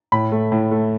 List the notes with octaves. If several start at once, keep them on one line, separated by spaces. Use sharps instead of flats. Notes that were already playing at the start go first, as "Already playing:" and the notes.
A2 B5
A3
A2
A3